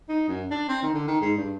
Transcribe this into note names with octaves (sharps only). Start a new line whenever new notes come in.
D#4
F#2
D4
C4
D#3
D3
D#3
G#2
G2